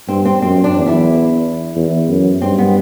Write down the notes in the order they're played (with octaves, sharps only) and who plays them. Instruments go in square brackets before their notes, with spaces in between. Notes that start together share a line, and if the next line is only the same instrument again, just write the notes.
[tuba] G2 [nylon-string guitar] C4
[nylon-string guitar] C4
[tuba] F#2 [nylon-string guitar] C4
[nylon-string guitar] D4
[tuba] E2
[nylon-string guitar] E4
[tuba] E2
F#2
[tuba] G2 [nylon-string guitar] C4
[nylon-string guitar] B3